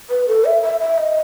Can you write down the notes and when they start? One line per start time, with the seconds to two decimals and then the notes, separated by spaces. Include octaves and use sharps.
0.10 B4
0.28 A4
0.45 E5
0.63 E5
0.81 E5
0.98 D#5